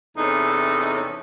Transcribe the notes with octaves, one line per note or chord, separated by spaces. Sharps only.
E2 C3 C#4 D#4 A4